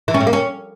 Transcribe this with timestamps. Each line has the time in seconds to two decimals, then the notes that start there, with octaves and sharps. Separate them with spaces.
0.08 E3
0.14 C#4
0.20 A2
0.27 A#3
0.33 C#4